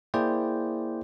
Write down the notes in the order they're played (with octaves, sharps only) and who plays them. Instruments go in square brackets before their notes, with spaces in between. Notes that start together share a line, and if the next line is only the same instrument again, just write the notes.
[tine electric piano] A#3 E4 G#4 C5 D5 G5